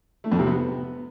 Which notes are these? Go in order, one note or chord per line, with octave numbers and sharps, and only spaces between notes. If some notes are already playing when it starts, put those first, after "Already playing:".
A3
F2
C3
B3